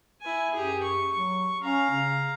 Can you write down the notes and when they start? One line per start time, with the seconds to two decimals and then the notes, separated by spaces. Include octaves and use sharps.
0.21 E4 G#5
0.54 F#2 G4 G#4
0.83 C#6
1.15 F#3
1.62 C#4 F5 A#5
1.91 C#3